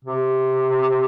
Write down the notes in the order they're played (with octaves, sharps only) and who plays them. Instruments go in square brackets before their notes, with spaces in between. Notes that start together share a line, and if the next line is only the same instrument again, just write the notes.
[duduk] C3